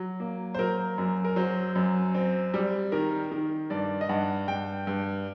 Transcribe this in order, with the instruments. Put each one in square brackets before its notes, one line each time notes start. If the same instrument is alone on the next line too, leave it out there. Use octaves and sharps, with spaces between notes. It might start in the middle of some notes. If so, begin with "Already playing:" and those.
Already playing: [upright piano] F#3
A#3
C5
F#3 A#4
F#2
A#4
F#3 C5
F#2
C4
G3
D#3 A#4
D#3
G2 D5
D#5
G2 F#5
G2 G5
G2